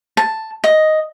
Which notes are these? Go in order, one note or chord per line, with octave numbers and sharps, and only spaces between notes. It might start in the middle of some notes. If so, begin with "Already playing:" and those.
A5
D#5